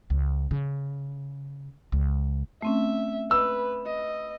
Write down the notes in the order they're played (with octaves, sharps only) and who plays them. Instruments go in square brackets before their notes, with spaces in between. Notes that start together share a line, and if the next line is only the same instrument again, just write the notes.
[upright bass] C#2
C#3
C#2
[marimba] A3 C4 C#4 [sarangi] E5
[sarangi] B4 [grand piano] E6
[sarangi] D#5